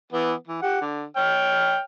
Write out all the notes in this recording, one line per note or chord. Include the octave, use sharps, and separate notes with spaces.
E3 B3
E3
G4 F#5
D3
C#5 G5 F6